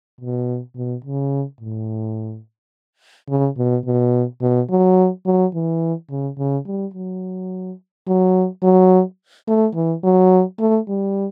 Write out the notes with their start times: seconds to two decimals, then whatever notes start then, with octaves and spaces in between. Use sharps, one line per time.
0.21 B2
0.76 B2
1.04 C#3
1.61 A2
3.29 C#3
3.58 B2
3.85 B2
4.41 B2
4.70 F#3
5.26 F#3
5.54 E3
6.10 C#3
6.38 C#3
6.66 G3
6.94 F#3
8.07 F#3
8.63 F#3
9.48 A3
9.75 E3
10.04 F#3
10.59 A3
10.88 G3